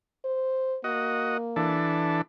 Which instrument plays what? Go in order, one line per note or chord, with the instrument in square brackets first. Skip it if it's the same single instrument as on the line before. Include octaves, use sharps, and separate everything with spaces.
[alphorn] C5
[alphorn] A#3 [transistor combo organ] F#4 D#5
[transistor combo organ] E3 D4 A4